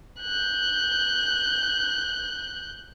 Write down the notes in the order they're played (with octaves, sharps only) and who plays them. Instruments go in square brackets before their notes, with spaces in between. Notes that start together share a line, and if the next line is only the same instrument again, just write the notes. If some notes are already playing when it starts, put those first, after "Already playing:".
[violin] F#6 G6